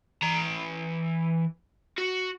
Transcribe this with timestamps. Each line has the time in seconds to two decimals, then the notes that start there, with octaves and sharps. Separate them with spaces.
0.22 E3 A#5
1.98 F#4